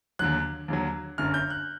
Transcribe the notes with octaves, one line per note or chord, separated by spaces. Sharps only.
D#2 D3 F#3 F#6
D#2 D3 F#3
G1 F#2 D3 F6
G6
F#6